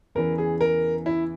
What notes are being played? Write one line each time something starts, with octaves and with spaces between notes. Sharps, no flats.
E2 C#3 E3 A#4
G#4
A#4
E4